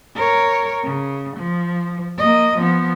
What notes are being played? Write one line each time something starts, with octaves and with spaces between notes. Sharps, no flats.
A#4 C#5
C#3
F3
A#3 D#5
F3 B3